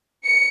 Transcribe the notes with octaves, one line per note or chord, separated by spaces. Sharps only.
C#7